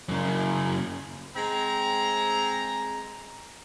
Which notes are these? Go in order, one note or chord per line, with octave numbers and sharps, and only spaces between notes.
F#2 C#3
G#3 C4 A#5